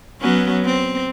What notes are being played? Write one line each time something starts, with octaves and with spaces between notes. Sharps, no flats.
F#3 B3 C#4
C4